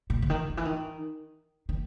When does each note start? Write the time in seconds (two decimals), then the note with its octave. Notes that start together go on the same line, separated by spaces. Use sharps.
0.10 A#2
0.22 D3
0.30 D#3
0.49 D#3
0.57 E3
0.65 D#3
1.69 D#3